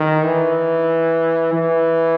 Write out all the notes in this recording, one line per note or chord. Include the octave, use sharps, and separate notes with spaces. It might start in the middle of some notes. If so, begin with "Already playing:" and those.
Already playing: D#3
E3
E3